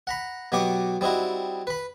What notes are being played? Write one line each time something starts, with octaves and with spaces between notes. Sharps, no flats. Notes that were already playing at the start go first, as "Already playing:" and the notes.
F#5 A#5 B5
B2 F#3 B3 G4 C#6 D6
G3 C4 D#4 E4 F#4
B4 B5